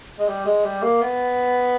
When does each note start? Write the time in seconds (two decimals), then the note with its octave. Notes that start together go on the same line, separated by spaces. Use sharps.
0.19 G#3
0.28 G3
0.46 G#3
0.64 G3
0.82 A#3
1.02 B3